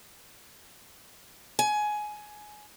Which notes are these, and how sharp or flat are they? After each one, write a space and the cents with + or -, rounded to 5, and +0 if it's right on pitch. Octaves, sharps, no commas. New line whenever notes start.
G#5 +15